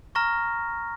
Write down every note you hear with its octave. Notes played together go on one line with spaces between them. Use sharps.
A#5 C#6 F6 A#6